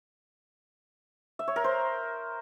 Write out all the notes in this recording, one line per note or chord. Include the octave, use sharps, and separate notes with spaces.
E5
C#5
A#4
C5